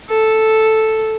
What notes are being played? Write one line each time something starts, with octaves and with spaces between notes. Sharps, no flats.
A4